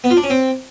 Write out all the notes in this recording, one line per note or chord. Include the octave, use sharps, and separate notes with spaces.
B3
F4
D4
C#4
C4